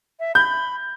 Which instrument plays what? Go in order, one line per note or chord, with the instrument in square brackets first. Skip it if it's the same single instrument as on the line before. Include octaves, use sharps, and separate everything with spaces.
[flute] E5
[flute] B5 [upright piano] G6